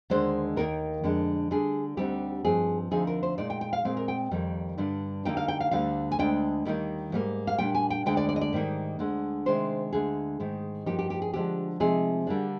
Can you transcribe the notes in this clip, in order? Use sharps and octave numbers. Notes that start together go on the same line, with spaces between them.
D#2 D3 G#3 D4 C5
D#2 D#3 A#3 D#4 A#4
F2 D3 G#3 D4
D3 G3 D4 G#4
D2 D3 G3 C4 D#4 G4
G2 F3 C4 D#4 G#4
D2 D3 F3 C4 D#4 G#4
A#4
C5
A#2 G#3 D#4 D5
G5
G5
F5
A#2 G#3 C4 F5
A#4
G5
F2 D#3 G3 A#3 D#4
G2 D3 G3 D4
D3 G3 A#3 D#4 G5
F5
G5
F5
D2 D3 G3 F5
G#5
D2 D3 G#3 D4 G5
D#2 D#3 G3 A#3 D#4
G#2 G3 A#3
F5
A#2 G3 D4 G5
G#5
G5
D2 D3 G#3 G5
D5
D5
D#5
D5
G#2 D#3 G3 A#3 D#4
D2 D3 G#3
C3 D#3 G#3 D4 C5
D2 D3 G#3 G#4
G#2 D#3 G#3
G2 F3 A#3 D#4 G4
G4
G4
G#4
D3 F3 G#3 D4 G4
C3 F3 G#3 C4 D#4 G#4
D3 G3 A#3 D4